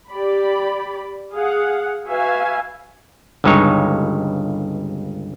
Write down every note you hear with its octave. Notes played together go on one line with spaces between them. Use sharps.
G4 D5 B5
G#4 F5 F#5
F#4 B4 E5 F5 G#5
G1 C#2 G2 G#3 D#4 C#5